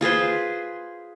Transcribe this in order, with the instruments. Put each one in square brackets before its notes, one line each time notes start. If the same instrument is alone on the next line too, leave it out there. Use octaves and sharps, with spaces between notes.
[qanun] F4 G#4 B4 C5